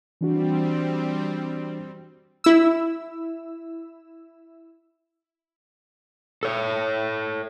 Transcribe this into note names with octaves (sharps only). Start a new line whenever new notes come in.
E3 G3 C4 D4 F#4
E4 E6
A4 C#5